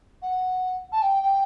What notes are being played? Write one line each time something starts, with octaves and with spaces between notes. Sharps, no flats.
F#5
A5
G5
G5